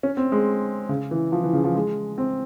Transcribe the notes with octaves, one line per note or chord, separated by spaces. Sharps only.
C#4
C4
G#3
C#3
E3
F3
E3
C#3
F3
G#3
C4